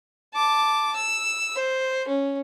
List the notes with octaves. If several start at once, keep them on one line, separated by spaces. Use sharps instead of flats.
A5 D6
E6
C5
C#4